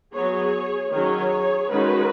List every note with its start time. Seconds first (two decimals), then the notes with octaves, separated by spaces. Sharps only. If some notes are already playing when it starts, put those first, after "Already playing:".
0.14 F#3 B3 G#4 C#5
0.92 D#3 F#3 C#4 G#4 C#5
1.71 D#3 G#3 C#4 F#4 B4